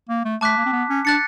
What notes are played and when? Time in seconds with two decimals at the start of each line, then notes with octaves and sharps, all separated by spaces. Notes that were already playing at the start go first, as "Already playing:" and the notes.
0.09 A#3
0.25 A3
0.41 A3 A5 D6 F#6 B6
0.57 A#3
0.66 C4
0.73 B3
0.90 C#4
1.05 D4 F#6 A6 C#7